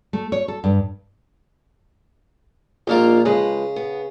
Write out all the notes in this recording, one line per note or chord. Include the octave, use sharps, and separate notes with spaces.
A3
C#5
A4
G2
A#1 G#2 A#3 D4 F4 A#4
C#3 F3 G#3 B4
B3